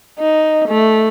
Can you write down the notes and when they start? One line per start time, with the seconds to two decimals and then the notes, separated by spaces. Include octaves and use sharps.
0.19 D#4
0.69 A3